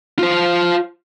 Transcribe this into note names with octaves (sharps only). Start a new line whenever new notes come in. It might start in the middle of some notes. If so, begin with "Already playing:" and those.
F4 C5